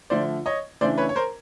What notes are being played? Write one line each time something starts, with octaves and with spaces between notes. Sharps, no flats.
D3 F3 A3 C5 D5
C#5 D#5
C#3 E3 A3 D4 C5 D5
B4 C#5
C#5
A#4 C5